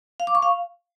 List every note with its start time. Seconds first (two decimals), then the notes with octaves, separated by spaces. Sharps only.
0.20 F5
0.27 D6
0.35 C#6
0.42 F5